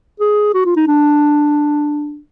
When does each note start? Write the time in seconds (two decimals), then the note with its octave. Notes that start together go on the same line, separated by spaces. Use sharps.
0.20 G#4
0.54 F#4
0.65 F4
0.76 D#4
0.87 D4